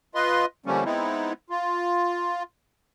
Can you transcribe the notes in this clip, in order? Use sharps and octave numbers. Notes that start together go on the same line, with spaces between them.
F4 B4 D#5 C6
D3 F3 G3 A3 A#3 C#4
G#3 B3 C4 D#4 E4
F4